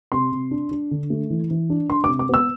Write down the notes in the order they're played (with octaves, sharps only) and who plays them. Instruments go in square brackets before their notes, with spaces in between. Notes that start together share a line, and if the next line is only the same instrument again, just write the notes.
[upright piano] C3 C6
C3
D4
D4
D3
A3
E3
E3
D4
D4 C6
D6
C3
D6
B3 E6